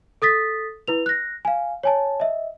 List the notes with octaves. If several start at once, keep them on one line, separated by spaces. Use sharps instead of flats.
A4 D#6 A6 B6
E4 B4 F7
F#6 A#6
F5 G#5
C#5 G#5 A5
D#5 E5